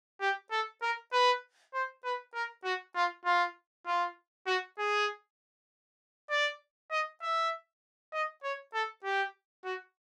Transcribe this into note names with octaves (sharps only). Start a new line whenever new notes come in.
G4
A4
A#4
B4
C5
B4
A#4
F#4
F4
F4
F4
F#4
G#4
D5
D#5
E5
D#5
C#5
A4
G4
F#4